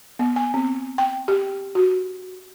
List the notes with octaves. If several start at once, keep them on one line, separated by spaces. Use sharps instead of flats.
B3
G#5
C4
G5
G4
F#4